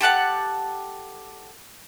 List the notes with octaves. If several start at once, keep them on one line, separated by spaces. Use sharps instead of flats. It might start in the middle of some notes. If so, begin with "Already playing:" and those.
G4 A4 F#5 A5